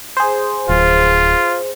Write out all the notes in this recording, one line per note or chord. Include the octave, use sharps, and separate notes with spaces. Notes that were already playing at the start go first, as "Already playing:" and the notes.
G#4 C5
D1 F4